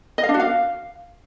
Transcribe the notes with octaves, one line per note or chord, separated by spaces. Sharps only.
D#5
F5
D4
F#4
F5